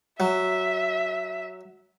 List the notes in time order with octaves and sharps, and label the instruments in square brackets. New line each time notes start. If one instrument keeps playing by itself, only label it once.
[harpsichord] F#3 [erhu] E5